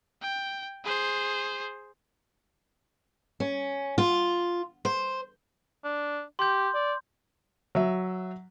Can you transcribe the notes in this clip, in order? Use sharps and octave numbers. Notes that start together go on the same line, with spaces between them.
G5
G#4 C5
C#4
F4
C5
D4
G4 C6 G6
D5
F#3 E5